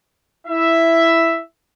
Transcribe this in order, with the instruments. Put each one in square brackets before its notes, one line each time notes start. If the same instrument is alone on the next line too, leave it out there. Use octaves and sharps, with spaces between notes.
[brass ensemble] E4 E5